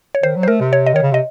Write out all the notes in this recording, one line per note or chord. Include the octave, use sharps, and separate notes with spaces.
C#5
D#3 C5
F#3
C5
A3 A#4
C3
C#5
D#5
D#3 C#5
C#3
C3 D#5